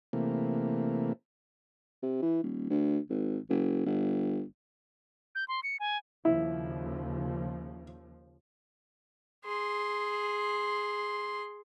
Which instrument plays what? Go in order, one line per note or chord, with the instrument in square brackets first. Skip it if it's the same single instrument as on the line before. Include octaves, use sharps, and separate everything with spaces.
[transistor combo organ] C3 E3 A3 A#3
[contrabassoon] C3
E3
D#1
D2
G#1
F#1
G1
[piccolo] G6
C6
C#7
G#5
[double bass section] D#2 C#3 F3 [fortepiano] E4
[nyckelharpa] G#4 C6